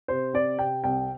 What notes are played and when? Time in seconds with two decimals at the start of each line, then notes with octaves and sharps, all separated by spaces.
0.08 C3 C5
0.33 C4 D5
0.59 C3 G5
0.84 C2 G5